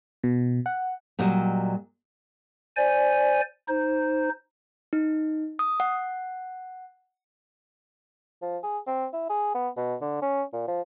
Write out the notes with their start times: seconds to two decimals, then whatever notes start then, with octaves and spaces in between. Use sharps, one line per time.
0.24 B2
0.66 F#5
1.19 A#2 F#3 G3 D#5
2.77 C5 D5 G#5
3.68 D#4 C5
4.93 D#4
5.59 D#6
5.80 F#5
8.42 F3
8.63 G#4
8.87 C4
9.13 E4
9.30 G#4
9.55 B3
9.77 B2
10.01 D3
10.22 C#4
10.53 A#2
10.68 F3